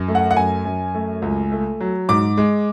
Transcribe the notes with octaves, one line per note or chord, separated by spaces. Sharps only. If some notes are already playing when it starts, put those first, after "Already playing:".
Already playing: F#2
A3
F#5
F#5
F#2 G#5
F#2
A3
C#2
A3
F#3
G#2 D6
G#3